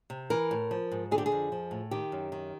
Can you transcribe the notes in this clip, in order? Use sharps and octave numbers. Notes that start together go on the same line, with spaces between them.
C3
E3 A#4
A2
F3
G#2
D3 G#4
G4
G#4
F2
F3
A2
D#3 G4
F#2
D#3